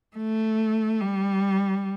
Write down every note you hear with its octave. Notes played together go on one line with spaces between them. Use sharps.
A3
G3